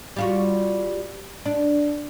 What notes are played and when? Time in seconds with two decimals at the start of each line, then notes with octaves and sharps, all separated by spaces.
0.16 G3 F4 F#4
1.46 D4